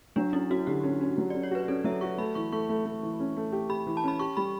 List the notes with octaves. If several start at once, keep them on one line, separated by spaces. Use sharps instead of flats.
F#3 D4
C#4 E4
C#4 F#4
D3 G4
C#4
C#4
F#3
C#4 D5
C#5
F#4 B4
C#4 A4
F#3 E5
F#4 C#6
A3 B5
E3 C#6
A3 C#6
A3
A3
E3
C#4
A3
G4
G4 B5
E3
A5
C#4 B5
G4 C#6
G3 B5